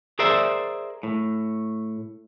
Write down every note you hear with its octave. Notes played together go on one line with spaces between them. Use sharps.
G#4 A#4 C5 D5 E5
A2